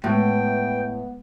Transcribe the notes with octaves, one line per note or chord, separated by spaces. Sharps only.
A2 G#3 B3 G5